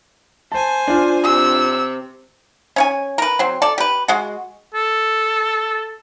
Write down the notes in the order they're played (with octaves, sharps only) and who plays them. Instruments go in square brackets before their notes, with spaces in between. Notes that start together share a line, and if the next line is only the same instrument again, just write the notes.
[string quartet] C5 G#5 [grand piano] A5
[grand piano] D4 F4
[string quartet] C3 [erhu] E6
[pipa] C#4 C#5 G#5
A#4 B4
F#3 C4
A4 D5
G4 B4
G#3 F#4
[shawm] A4